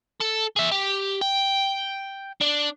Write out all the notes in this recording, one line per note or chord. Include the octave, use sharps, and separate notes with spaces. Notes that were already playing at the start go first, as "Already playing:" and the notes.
A4
G#4 E5
G4
G5
D4